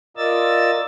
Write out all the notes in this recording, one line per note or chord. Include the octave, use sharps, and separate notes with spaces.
F4 A#4 D5 D#5 E6 A6